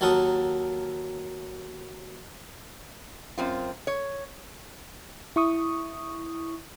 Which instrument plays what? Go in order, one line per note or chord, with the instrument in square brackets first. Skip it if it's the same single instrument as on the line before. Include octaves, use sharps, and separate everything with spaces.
[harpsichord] D#2 F#3 A4 A#4 F#5 D#6
[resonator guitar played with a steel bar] F#2 C4 F4
C#5
[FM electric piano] E4 C#6 D#6